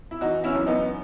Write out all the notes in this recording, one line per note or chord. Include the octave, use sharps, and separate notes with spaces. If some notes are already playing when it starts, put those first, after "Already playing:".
E4
E3 D#4 F#4
C#4 E4
F#2
B3 D#4